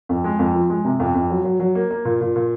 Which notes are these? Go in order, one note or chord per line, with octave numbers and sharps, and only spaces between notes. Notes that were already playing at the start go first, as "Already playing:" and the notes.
F2
G#3
F2
F3
G#3
C3
F2
F2
F#3
F#3
F#3
A#3
A#3
A#2
A#2
A#2